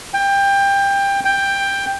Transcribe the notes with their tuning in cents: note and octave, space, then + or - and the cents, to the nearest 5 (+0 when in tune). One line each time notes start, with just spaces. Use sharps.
G5 +20
G5 +10